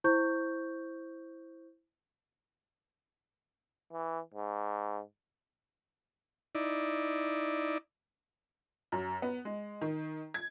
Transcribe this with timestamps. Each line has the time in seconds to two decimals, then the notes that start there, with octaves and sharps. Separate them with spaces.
0.04 E4 C5 C#6 G6
3.92 E3
4.34 G#2
6.55 D#4 E4 D5
8.92 F#2
9.22 B3
9.45 G#3
9.81 D#3
10.34 G#6